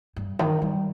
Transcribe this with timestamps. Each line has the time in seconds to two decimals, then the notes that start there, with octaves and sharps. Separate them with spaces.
0.16 G2
0.39 D#3
0.62 G3